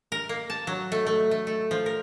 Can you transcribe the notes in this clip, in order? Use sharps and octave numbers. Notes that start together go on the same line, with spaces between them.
A#4
A#3
A5
F#3
A3
A3
A3
A3
F3
A#4